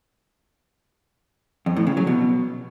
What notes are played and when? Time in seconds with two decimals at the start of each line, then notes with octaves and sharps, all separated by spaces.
1.66 F2
1.76 A2
1.87 C#3
1.97 F#3
2.07 B2